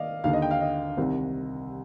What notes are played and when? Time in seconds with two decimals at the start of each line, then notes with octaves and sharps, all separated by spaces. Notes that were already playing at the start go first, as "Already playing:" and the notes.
Already playing: D#3 D5 D#5 F5
0.24 D#2 D3 F5
0.33 D#5
0.42 G5
0.51 F5
0.60 D#5
0.97 C2 C3 D#3